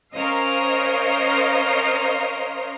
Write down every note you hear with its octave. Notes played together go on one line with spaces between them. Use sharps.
C#4 A#4 C5 D#5 F5